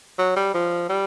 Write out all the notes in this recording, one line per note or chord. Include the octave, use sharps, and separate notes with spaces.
F#3
G3
F3
G3